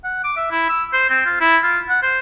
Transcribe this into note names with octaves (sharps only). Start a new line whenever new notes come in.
F#5
D6
E5
E4
E6
C5
C4
F4
E4
F4
F#5
C5